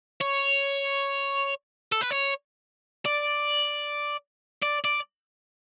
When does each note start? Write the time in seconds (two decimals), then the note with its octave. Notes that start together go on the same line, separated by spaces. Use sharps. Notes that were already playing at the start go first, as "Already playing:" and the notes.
0.21 C#5
1.92 A4
2.01 B4
2.11 C#5
3.05 D5
4.63 D5
4.84 D5